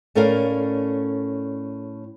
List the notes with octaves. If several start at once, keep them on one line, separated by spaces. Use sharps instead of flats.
A2 C#4 A4 A#4 D5 F5